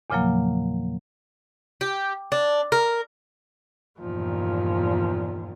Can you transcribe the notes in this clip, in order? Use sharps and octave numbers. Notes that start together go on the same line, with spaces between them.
E2 A#2 C#3 F3 F#3 A#3
G4
D4
A#4
E2 G2 A#2 D#3 F3